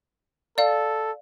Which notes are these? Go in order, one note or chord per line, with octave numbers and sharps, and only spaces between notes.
A4 D5 F5